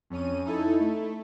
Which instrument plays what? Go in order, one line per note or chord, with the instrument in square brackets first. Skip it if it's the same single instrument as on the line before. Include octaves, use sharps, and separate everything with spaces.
[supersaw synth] F2 C#4 D#7
D#4 E4 A4
A3